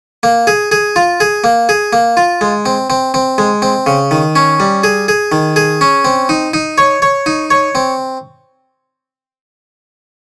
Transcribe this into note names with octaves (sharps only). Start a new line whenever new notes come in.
A#3
G#4
G#4
F4
G#4
A#3
G#4
A#3
F4
G#3
C4
C4
C4
G#3
C4
C#3
D#3
C#4
G3
G#4
G#4
D#3
G#4
C#4
C4
D#4
D#4
C#5
C#5
D#4
C#5
C4